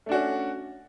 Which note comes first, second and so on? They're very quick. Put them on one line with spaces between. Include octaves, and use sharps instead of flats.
A3 D4 F#4 C#4